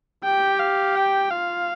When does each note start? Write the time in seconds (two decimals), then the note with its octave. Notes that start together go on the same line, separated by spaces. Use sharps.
0.24 G4 G5
0.60 F5
0.96 G5
1.31 F4 F5